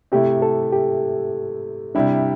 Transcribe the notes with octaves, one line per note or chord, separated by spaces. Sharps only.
C3 A3 E4 G4
A4
G4
C3 G3 D4 E4